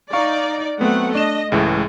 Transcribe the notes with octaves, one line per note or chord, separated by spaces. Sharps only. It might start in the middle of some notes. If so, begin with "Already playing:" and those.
D#4 D5 F5 C#6 F6
F#3 A3 B3 C4 F#5
D4 D#5 E7
C#2 A2 E3 G#3